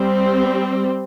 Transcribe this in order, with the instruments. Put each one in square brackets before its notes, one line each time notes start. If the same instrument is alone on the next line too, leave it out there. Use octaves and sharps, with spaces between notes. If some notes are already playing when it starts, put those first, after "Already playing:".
Already playing: [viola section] G3 C4